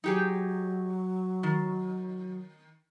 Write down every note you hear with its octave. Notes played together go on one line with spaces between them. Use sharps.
F#3 D#4 G4 G#4
D#3